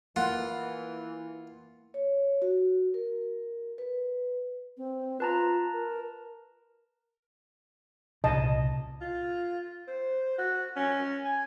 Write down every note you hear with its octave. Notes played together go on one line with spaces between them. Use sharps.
E3 A#3 F4 F#5
C#5
F#4
A#4
B4
C4
F4 B4 A5 A#5
A#4
C2 A#2 C#3 D#5 A5
F4
C5
F#4
C#4
G#5